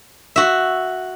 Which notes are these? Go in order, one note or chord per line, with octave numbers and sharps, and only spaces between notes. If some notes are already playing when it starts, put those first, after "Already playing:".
F#4 E5